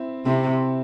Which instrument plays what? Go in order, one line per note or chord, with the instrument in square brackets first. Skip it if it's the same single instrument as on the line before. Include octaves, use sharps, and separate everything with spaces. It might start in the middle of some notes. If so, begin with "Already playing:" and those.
Already playing: [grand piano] C4 E4
[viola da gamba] C3 [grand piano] C4 E4